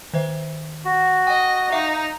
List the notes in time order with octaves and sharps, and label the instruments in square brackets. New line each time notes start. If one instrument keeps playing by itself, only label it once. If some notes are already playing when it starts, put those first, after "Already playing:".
[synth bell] D#3 C5 E5
[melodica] F#4
[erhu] D#5 [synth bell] G5 A#6
[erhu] D#4 [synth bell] E5 F5 D6